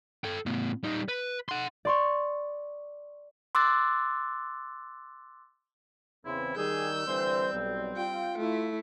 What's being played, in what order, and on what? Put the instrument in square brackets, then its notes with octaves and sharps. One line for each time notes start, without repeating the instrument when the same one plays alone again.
[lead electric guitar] A4 G5
A2 B3
G3 D#4
B4
F#5 C6
[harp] D5 C6 C#6
[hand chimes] C6 D6 E6 F#6 A6
[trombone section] E2 C#3 C5 [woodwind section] E3 C4 E4
[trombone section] D#3 G3 [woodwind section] G#4 [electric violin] E6 G6
[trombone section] D3 E3 C5 [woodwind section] G3 C4
[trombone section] B1
[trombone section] F4 [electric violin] G5
[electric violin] A3 E4